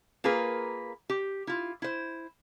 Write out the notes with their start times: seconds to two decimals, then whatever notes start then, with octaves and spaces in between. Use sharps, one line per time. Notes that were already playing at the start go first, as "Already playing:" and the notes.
0.24 A#3 F4 G#4 A#4 B4
1.10 G4
1.47 E4 F4
1.82 E4 C5